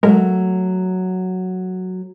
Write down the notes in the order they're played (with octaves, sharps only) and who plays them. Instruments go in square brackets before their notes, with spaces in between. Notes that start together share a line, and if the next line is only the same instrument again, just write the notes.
[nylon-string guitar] F#3 A3 [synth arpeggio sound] G#3 A#4